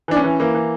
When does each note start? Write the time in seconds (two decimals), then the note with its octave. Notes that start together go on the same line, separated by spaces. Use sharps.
0.08 E3 D4
0.16 C#4
0.24 E3
0.40 E3 A#3
0.54 E3